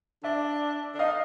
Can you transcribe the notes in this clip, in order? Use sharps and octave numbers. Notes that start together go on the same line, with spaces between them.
D4 D5 E5
D4
D#4 D#5 F5